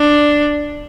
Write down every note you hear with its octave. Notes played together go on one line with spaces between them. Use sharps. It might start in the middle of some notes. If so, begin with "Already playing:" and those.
Already playing: D4